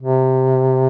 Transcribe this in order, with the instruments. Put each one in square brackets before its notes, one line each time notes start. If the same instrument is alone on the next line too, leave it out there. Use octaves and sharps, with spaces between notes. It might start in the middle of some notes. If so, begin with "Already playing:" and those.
[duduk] C3